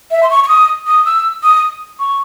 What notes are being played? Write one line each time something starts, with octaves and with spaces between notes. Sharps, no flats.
E5
C6
C#6
C#6
D#6
D#6
E6
D#6
C#6